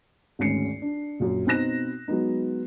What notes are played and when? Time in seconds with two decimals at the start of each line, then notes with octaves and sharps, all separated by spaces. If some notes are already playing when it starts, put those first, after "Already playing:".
0.39 G#1 D2 G#3 C#4 C7 C#7
0.82 D4
1.20 A#1 F#2
1.46 B2 C4 D#4 F#6 A#6 E7
2.08 F#3 G#3 B3 D#4